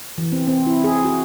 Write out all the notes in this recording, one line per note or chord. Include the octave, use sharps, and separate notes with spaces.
E3
C4
C4
E4
G#4
F#4